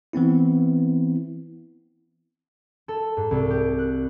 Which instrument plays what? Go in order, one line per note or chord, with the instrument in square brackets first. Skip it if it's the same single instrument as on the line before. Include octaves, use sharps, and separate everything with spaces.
[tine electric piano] E3 B3 C4 E4
[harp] A4
G#2
C2
G4
F#6